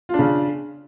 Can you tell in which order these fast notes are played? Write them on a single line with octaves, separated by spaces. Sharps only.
F4 D4 C#3